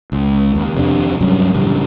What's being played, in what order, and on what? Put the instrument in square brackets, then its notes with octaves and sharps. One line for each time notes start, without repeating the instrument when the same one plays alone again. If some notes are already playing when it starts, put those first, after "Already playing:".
[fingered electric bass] C#2
D#2
F2 C3 D4
D2 G2 F#3 C#4
A1 C#3 G3 D4